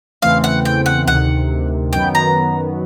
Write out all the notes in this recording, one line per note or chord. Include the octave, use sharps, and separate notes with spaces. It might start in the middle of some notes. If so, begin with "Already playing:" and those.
E2 C#3 E3 A3 C4 F5
F#5
G5
F#5
D2 C3 D#3 F#5
F#2 D#3 F#3 B3 G5
A#5